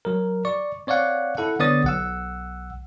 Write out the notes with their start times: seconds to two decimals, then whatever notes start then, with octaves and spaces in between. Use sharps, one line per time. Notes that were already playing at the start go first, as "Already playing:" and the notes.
0.05 F#3 A#4
0.45 D5 C#6
0.87 C4 C#5 D5 F5 F#5
1.37 E4 A4 F#5
1.59 D3 B3 C#5 D5 D#6 A6
1.84 B1 F#5 E6